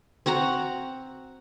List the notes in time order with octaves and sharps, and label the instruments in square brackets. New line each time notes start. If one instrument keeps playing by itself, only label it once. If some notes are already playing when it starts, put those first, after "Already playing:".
[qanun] C4 F#4 F#5 A#5